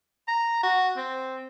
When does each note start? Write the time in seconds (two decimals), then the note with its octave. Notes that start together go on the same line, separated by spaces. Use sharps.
0.28 A#5
0.63 F#4
0.97 C4